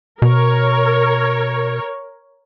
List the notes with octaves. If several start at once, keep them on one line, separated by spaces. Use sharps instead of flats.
B2 A#4 C#5